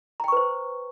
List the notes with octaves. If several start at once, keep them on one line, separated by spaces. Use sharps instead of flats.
B4 C5 G5 A#5 C#6